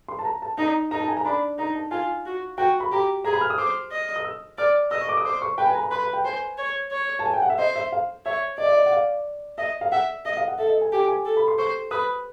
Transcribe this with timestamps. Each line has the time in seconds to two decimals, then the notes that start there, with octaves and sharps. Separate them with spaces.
0.08 C6
0.19 A5
0.25 A#5
0.42 A5
0.58 D#4 A#5
0.91 D#4 A#5
1.00 A5
1.08 G#5
1.17 A#5
1.25 D4 B5
1.58 D#4 A#5
1.75 A5
1.91 F4 G#5
2.26 F#4
2.58 F#4 G5
2.80 B5
2.92 G4 A#5
3.25 G#4 A#5
3.33 B5
3.41 F6
3.50 D#6
3.58 C5 D6
3.91 D#5
4.16 D#6
4.25 E6
4.58 D5 F6
4.91 D#5 E6
5.01 C#6
5.09 D6
5.17 D#6
5.25 C5 D6
5.42 C#6
5.58 B4 G5
5.67 G#5
5.75 A#5
5.83 B5
5.91 B4 C6
6.03 B5
6.13 G5
6.24 C5 G#5
6.58 C#5
6.91 C#5
7.19 A5
7.26 G#5
7.33 G5
7.42 F#5
7.50 E5
7.58 C5 D#5
7.75 E5
7.92 F5
8.26 C#5 E5
8.58 D5 D#5
8.66 E5
8.74 D#5
8.86 F#5
8.92 F5
9.58 D#5 E5
9.81 F5
9.92 E5 F#5
10.25 D#5 E5
10.37 F5
10.48 F#5
10.58 A4 E5
10.69 D#5
10.81 G#5
10.92 G4 G#5
11.08 G#5
11.25 A4
11.37 B5
11.48 C6
11.59 C5 C#6
11.91 B4 D#6